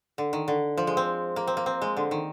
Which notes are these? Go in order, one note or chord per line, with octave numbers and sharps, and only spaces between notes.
D3
D#3
D3
F3
G#3
C4
A#3
C4
A#3
C4
G#3
D3
D#3